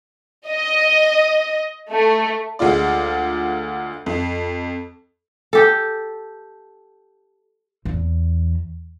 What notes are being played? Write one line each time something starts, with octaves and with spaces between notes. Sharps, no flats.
D#5
A3
D2 G#3 F4 D5
F2
G4 A4
E2